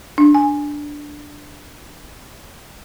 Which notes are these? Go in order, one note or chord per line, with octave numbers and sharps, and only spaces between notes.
D4
G#5